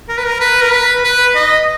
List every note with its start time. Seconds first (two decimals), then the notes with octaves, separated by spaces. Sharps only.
0.09 A#4
0.18 B4
0.26 A#4
0.40 B4
0.62 A#4
0.72 B4
1.04 B4
1.35 D#5